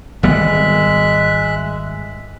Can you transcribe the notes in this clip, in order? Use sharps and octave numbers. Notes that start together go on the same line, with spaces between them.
G#1 G3 G#3 B3 E5 F#6